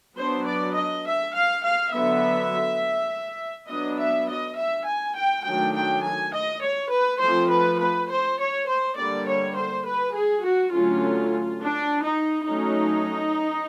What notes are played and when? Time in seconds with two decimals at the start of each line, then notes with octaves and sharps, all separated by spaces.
0.18 F#3 B3 D4 C5
0.47 D5
0.77 D#5
1.06 E5
1.36 F5
1.64 F5
1.93 D3 F#3 B3 E5
3.69 F#3 B3 D4 D#5
4.00 E5
4.29 D#5
4.58 E5
4.87 G#5
5.16 G5
5.46 D#3 F#3 A3 D4 G5
5.75 G5
6.04 G#5
6.33 D#5
6.62 C#5
6.92 B4
7.21 F3 A3 C4 C5
7.50 B4
7.80 B4
8.10 C5
8.39 C#5
8.68 C5
8.97 D3 G3 A#3 D5
9.27 C#5
9.56 C5
9.86 B4
10.15 G#4
10.44 F#4
10.73 D3 F#3 A3 C#4 F4
11.61 D4
12.06 D#4
12.49 F#3 A3 C#4 D#4